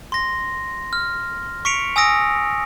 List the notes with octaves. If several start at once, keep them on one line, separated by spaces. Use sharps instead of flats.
C6 A#6
F6
C#6 B6 C#7 D7 F7
G#5 D#6 E6 A#6 D7